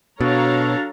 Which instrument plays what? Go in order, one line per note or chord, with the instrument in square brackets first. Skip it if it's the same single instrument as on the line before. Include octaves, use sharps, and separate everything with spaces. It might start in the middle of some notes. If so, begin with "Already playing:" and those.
[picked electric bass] B2 [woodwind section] F#3 F#4 A4 [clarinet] D4 [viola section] C#5 F5 A#5